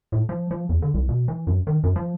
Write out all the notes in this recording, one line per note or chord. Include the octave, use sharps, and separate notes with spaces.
A2
F3
F3
E2
D3
C2
B2
E3
F#2
D#3
F#2
F3